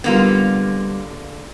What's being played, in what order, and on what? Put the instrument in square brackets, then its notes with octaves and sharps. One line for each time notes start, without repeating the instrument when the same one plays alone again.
[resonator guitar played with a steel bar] D3 A#3 F4 [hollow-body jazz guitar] G3 B3